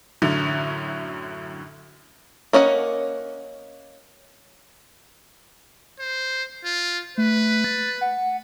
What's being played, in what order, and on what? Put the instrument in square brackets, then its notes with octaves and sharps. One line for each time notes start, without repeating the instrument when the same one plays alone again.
[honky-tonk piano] F#2 A2 D3 F#3
[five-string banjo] A#3 C#4 D#5 F#5
[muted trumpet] C5
F4
[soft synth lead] A3 [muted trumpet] B4
[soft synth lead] A6
F#5